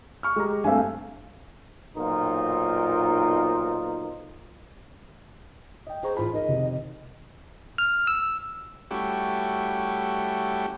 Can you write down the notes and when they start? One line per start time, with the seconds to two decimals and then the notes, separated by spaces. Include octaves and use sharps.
0.23 C#6 F6
0.36 G#3 G4 A#5
0.64 G2 A3 C4 E5 F5 G#5
1.97 B1 A#2 D#4 F4 A#4 C5
5.87 D#5 G5
6.03 G#4 C5 A#5 C#6
6.17 A1 F4 B5
6.34 D#4 G#4 A#4 D#5
6.48 F1 C3 D#3
7.78 F6
8.07 E6
8.91 G3 A3 C#4 E4 F#4 G4